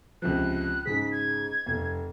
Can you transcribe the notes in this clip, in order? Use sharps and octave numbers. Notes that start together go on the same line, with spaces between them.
C#2 C3 F3 F#6
G#2 C#3 G#4 B6
G#6
F1